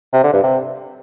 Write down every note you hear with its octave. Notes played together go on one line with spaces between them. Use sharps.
C3
D3
G2
C3